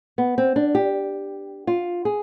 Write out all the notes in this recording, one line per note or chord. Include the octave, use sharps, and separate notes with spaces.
B3
C4
D4
G4
F4
G#4